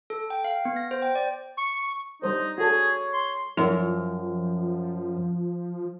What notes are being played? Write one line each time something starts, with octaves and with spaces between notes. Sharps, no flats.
A4
G5
F5
B3
A#6
C5
G5
D5
C#6
G3 D#4 C5 C#5
F#4 G#4 A4 C#5
C6
F#2 F3